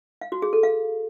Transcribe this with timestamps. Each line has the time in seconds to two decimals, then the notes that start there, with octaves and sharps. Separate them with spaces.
0.21 F5
0.32 F#4
0.42 G#4
0.53 A4
0.63 F5